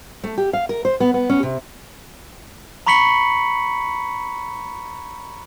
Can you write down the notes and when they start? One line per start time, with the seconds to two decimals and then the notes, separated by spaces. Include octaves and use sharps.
0.24 A3
0.38 G4
0.53 F5
0.69 A#4
0.85 C5
1.00 B3
1.14 B3
1.29 C#4
1.43 C3
2.87 A#5 B5 C#6 B6 C#7 F#7